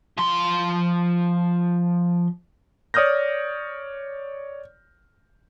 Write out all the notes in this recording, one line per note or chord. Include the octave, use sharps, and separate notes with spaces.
F3 C6
C#5 D5 D#6 F6 G6 A#6